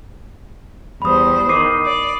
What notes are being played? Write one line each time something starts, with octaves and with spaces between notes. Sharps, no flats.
E2 G3 C5 B5 D#6
D#3 D6 C7 D#7
D5